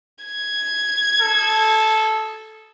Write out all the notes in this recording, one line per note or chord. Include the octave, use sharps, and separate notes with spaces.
G#6
A4